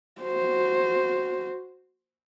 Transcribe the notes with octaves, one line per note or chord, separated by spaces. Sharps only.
F#4 C5